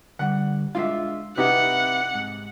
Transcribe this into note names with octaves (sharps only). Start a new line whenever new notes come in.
D3 G3 F#5
G#3 D4 F4 E5 F5
C3 C4 D#4 E4 G4 B4 F#5
G#2